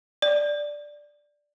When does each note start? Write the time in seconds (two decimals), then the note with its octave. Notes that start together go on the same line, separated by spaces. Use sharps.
0.22 D5